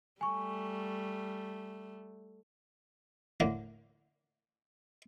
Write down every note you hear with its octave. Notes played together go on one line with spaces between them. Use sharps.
G3 A3 G#5 C#6
A2 D3 A#3